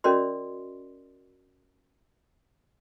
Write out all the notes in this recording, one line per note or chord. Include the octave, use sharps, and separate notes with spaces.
C#4 F#4 A#4 D5 D#5 C6